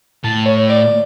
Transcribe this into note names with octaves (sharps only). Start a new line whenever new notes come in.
A2 A5
C#5
D5